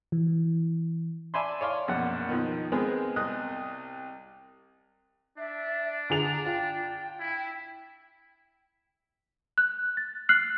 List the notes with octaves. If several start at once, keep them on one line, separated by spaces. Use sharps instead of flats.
E3
D5 E5 G#5 A5 B5 C6
C#5 D5 F5 C6
A#1 F#2 B2 F#5
B2 D#3 F3
G#3 B3 C4 G#4 A#4
C2 D#5 D#6 F#6
D4 E5
D3 G#4 A#5 F7
F4 G5
E4
F#6
A6
F6 F#6 C7 F#7